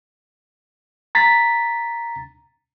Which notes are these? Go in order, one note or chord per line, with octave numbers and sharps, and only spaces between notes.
A#5 A6 B6